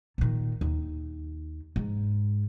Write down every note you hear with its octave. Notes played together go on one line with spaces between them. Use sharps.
A#2 D#3
D#2
G#2